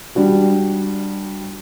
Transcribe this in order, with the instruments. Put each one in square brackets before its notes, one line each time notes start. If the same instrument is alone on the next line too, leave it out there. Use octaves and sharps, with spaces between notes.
[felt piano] G3 D4 F#4 G4